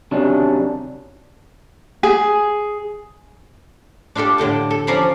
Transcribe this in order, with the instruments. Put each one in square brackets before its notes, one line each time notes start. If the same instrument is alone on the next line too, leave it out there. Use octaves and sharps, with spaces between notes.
[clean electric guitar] C3 D#3 F#3 C#4 D4
[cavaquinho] G#4
[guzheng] D4 F4 G4 A4 D5
A2 D3 G5 A5
A4
F3 C#4 D5 F5 A#5 B5